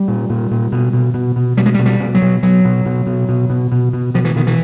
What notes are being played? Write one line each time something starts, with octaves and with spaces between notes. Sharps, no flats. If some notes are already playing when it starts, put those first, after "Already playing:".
Already playing: G3
A#2
A#2
A#2
B2
B2
B2
B2
B2 G3
G#3
G3
B2
G3
B2
F#3
B2
B2 F#3
B2
B2
B2
B2
B2
B2
B2
B2 F3
E3
B2 D#3
E3